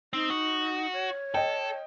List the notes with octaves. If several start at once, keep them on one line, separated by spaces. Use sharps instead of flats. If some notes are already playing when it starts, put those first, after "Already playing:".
C4 D#4
F#4
C#5
A4 D#5 G5